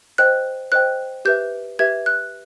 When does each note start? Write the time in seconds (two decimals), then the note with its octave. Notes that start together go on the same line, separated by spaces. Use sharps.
0.18 C5 D#5 G5 F#6
0.72 C5 D#5 G5 F#6
1.25 G4 B4 E5 G6
1.79 G4 B4 E5 G#6
2.06 F#6